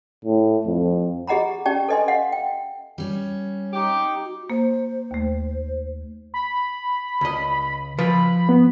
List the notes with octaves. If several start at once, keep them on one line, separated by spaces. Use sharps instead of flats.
A2
F2
G4 G#4 D#5 F#5 A#5 B5
C#4 G4 D5 G5 A5
A4 B4 D#5 G#5 C6
D#5 F5 F#5 C6
G5
G3 C#4
D#4 G4
F#4
A#3 C5
D#2 A3
B5
C#2 D#5
F3 B4 B5
B3